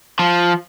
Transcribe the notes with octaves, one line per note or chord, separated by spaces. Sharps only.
F3